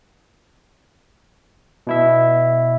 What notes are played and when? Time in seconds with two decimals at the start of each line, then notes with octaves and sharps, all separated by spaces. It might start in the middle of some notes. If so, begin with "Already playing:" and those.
1.87 B2 E4 E5